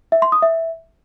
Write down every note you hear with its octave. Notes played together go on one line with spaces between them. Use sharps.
E5
C6
D#6
E5